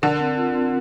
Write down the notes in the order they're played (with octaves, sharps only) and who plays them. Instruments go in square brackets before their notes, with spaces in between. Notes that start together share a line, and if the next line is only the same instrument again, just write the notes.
[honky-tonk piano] D3 [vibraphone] A#4
[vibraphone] C4
F4
C4